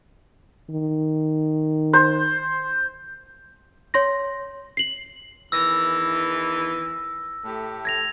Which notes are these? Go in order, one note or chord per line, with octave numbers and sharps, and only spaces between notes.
D#3
C5
C#5 C6 A#6
C7 F#7
E2 D#3 E3 E6 A#6
A2 A3 G4
G#6 A#6 F7